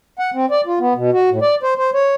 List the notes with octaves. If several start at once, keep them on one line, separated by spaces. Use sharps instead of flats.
F#5
C4
D5
F4
B3
B2
F#4
A2
D5
C5
C5
C#5